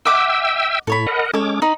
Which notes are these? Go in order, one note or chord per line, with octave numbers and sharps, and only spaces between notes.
D#5 E5 F#5 G5 D6 E6
A2 A4 C#5 B5
A#4 D#5 F#5
G#3 C#4 A4 C#5 D6
D#4 B5